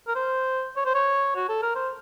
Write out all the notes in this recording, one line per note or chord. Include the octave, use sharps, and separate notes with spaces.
A#4
C5
C#5
C5
C#5
F#4
A4
A#4
C5